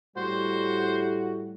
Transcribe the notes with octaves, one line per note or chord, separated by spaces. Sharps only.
A2 G3 F#4 C5